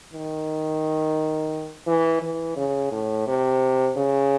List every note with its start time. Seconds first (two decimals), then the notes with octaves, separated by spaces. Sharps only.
0.13 D#3
1.87 E3
2.22 E3
2.56 C#3
2.91 A2
3.27 C3
3.96 C#3